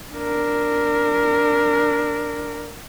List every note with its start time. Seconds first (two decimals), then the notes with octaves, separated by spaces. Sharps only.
0.14 D4 A#4